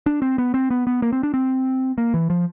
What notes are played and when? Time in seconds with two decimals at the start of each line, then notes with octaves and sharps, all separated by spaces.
0.06 D4
0.22 C4
0.38 B3
0.54 C4
0.70 B3
0.87 B3
1.02 A#3
1.12 C4
1.23 D4
1.34 C4
1.98 A#3
2.14 E3
2.30 F3